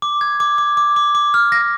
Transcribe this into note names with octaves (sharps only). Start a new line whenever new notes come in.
D6
G#6
D6
D6
D6
D6
D6
F6
A#6